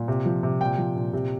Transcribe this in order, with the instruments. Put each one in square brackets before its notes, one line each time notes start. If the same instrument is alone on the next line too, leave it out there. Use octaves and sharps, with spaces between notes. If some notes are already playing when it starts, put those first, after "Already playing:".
Already playing: [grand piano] A#2
C3
F3
C3
A#2 G5
F3
A#2
C3